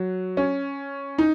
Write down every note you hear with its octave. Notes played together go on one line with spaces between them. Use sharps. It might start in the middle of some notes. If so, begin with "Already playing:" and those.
Already playing: F#3
C#4
D#4